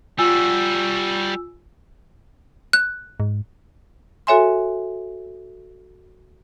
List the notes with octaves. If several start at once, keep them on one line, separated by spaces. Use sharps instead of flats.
G3 F4 F#4 G#5 E6
F#6
G#2
F#4 A4 C#5 E5 G#5 C6